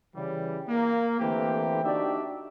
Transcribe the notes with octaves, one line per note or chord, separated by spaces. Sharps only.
C#3 E3 G3
A#3
D3 E3 A3 A#3 C4 G4
D4 D#4 F#4 G4 D5 E5